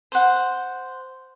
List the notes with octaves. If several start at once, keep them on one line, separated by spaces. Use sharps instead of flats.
C5 F#5